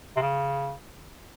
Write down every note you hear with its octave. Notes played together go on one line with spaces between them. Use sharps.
C3
C#3